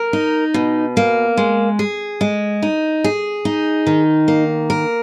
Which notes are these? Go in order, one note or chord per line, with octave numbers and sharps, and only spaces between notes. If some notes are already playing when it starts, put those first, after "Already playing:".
Already playing: A#4
D#4
B2
A#3
G#3
G#4
G#3
D#4
G#4
D#4
D#3
A#3
A#4